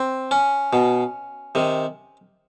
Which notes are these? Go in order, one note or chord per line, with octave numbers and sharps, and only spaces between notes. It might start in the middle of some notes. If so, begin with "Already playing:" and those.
Already playing: C4
C#4
B2
C3 D#3